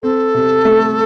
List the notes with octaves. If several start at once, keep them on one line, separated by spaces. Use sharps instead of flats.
C4 A4
C3
A3